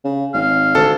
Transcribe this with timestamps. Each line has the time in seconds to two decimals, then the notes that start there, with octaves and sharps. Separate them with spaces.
0.04 C#3
0.34 G#1 F5
0.75 D2 A4